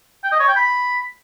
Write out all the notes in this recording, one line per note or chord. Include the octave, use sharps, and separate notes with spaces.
G5
D#5
C#5
G5
B5